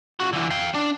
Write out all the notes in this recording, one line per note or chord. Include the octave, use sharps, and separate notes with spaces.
C#2 F#4
D3 E3
F5 G5
D4